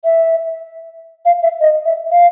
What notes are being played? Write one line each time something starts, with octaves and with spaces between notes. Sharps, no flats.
E5
F5
E5
D#5
E5
F5